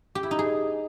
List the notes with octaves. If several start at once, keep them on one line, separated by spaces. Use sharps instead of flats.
G4
E4
D#4
G#4